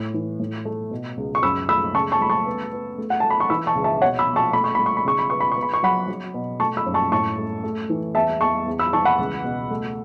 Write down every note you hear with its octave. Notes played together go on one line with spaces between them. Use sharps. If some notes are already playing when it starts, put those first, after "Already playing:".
Already playing: A2
E3
A2
A3
B2
C#2
C#6
F#2 B5 E6
A3 B5 E6
C#3 A5 C#6
A5 C#6
A3 B5
A5 C#6
B3
B3
A3
F#5
A3 A5
B5
C#6
E3 B5 E6
A5 C#6
C#2
E5 A5
B2 C#5 F#5
B5 E6
B2
A5 C#6
A3 B5
C#6
A3 B5
C#6
B5
C#3 C#6
B5
B3 C#6
B5
B3 C#6
B5
C#6
F#3 F#5 B5
F#3
B2
A3 A5 C#6
B5 E6
F#2
A5 C#6
A2 A5 C#6
A3
A3
E3
E2 E5 A5
E2 A5 C#6
E2
B5 E6
E3 A5 C#6
F#5 B5
C#2
B2
A3